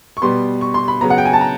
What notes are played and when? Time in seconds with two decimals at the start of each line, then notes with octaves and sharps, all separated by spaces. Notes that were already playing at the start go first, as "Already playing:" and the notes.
0.17 C#6
0.22 B2 G3 B3 C6
0.61 C#6
0.74 C6
0.88 B5
1.01 C#3 F#3 B3 A#5
1.10 F#5
1.18 G5
1.25 G#5
1.33 A5
1.41 A#5